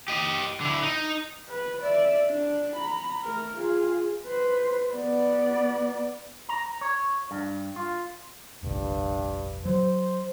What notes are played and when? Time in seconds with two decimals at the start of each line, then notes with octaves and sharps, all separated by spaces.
0.08 G4 D#5
0.61 D3 E4
0.83 D#4
1.49 B4
1.82 D5 E5
2.28 D4
2.76 A#5 B5
3.23 A3 A#4
3.56 F4 G#4
4.26 B4 C5
4.94 B3 D5
6.49 A#5
6.81 C#5
7.31 G2
7.76 F4
8.63 F1 A#1 G2
9.65 F#3 C5